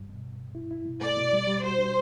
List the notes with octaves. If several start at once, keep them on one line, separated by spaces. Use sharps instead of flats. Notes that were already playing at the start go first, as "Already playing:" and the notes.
Already playing: G2
B2
B2
B2
E4
E4
B2
A3 D5
B2
G3
G3
F#4 C5
D4